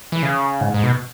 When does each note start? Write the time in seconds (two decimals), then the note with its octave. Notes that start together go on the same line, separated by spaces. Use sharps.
0.12 E3
0.23 C#3
0.61 G#2
0.74 G#2
0.83 B2